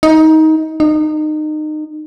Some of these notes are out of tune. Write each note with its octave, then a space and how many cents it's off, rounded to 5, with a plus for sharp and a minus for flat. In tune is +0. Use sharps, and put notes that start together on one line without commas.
D#4 +20
D#4 -25